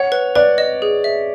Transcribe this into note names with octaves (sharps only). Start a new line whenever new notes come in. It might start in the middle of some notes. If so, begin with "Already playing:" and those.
Already playing: C#5 F#5
B4
B4 D5
D#5
G#4
E5